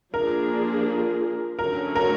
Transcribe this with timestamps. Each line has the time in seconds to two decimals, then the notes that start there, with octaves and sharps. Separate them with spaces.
0.13 F3 A#3 D4 F4 G#4 A#4
1.59 D3 F#3 A3 C#4 F#4 A#4
1.96 A#4